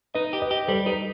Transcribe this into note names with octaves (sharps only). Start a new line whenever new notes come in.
D#4 B4 D#5
G4
B4 D#5
G4
G3 A4 C5
D#4 G4 B4